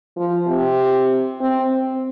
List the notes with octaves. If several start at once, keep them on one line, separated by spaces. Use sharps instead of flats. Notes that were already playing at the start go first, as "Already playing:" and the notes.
F3
C3
C4
C4